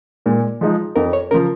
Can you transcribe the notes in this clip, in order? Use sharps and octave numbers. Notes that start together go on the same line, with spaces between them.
A#2 G#3
F3 G#3 D#4
F2 A#4
C#5
C#3 F3 A#4